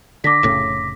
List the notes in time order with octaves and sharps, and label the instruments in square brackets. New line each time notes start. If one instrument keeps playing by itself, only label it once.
[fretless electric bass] D3 [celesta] D6 A#6 B6
[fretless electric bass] F1 A2 C#3